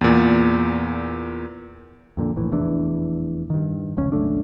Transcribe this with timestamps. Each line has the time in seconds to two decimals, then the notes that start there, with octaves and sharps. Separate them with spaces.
0.01 E2 A#2
2.17 F2 A#2 D3
2.36 A#1 A2 E3
2.52 F1 E2 E3 D4
3.50 G2 D#3
3.97 F1 C#2 C#4
4.12 F#1 B1 A3 D4